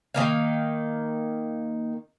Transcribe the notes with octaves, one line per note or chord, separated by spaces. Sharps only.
D#3 A#3 F5